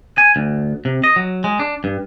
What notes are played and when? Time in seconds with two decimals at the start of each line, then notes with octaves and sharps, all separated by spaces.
0.18 G#5
0.36 D2
0.85 C3
1.04 D#5
1.16 F#3
1.44 G#3
1.59 D4
1.84 G2